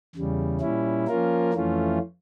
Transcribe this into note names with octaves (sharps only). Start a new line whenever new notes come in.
E2 C#3 G3
A#2 G3 C#4 E4
F3 A#3 C#4 F4 A#4
F2 E3 A3 C#4 F4